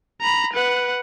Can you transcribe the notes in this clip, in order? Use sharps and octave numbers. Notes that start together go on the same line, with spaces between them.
A#5 B5
B4 F#5